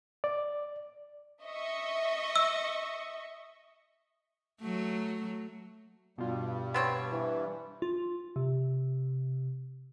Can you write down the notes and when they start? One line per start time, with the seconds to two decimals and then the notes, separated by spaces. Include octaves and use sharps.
0.24 D5
1.45 D#5 E5 C#6
2.36 E6
4.61 F#3 A3
6.18 G2 B2 G3 F4
6.74 B3 C4 C#5
7.11 E3
7.82 F4
8.36 C3